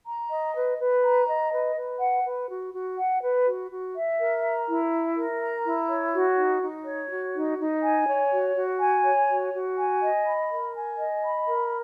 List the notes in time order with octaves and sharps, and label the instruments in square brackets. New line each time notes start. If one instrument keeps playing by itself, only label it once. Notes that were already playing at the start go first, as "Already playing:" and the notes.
[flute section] A#5
D#5
B4
B4
A#5
D#5
B4
B4
F#5
B4
F#4
F#4
F#5
B4
F#4
F#4
E5
A#4
A#5
E4
E5
A#4
A#5
E4
C#5
F#4
D#4
D#4
C#5
F#4
D#4
D#4
G#5
C#5
F#4
F#4
G#5
C#5
F#4
F#4
G#5
D#5
B5
A#4
G#5
D#5
B5
A#4